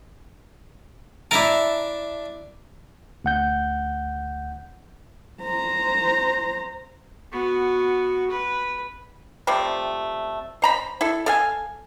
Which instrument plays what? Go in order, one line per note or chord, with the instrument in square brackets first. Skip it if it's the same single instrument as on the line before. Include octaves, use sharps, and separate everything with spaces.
[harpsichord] D4 E5 A5 [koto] E4 A#4
[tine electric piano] D2 F#5 G6
[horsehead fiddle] C5 A#5
[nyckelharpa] B3 F#4
B4
[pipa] C3 F3 G3 A3
C5 A#5 B5
E4 A4
A4 F5 G#5